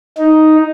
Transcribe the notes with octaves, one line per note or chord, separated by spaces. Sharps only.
D#4